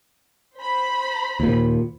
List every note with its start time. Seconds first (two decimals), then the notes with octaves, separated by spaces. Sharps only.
0.57 C5 B5
1.40 D#2 A#2